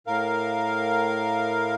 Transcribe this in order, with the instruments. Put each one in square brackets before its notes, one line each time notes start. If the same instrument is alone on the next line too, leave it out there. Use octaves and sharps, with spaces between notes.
[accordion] A2 A#4 F5